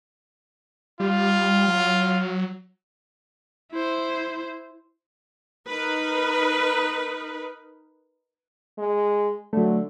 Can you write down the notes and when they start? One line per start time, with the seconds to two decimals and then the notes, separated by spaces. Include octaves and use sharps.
1.00 G3 F4
1.68 F#3
3.72 E4 C5
5.68 D#4 A#4 B4
8.78 G#3
9.53 D3 F#3 A3